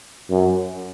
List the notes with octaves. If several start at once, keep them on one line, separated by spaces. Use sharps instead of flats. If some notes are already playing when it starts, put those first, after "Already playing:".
F#2